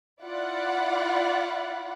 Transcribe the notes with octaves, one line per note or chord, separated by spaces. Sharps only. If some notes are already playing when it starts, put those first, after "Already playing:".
E4 F4 D5 F#5 B5